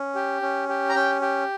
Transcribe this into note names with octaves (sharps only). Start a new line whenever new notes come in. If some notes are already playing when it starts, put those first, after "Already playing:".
Already playing: C#4
G4
C#4
G4
A#5
C#4 G5
G4